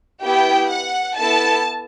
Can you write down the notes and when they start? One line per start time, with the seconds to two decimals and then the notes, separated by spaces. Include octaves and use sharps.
0.22 B3 E4 G4 G5
0.69 F#5
1.17 B3 E4 A4 A5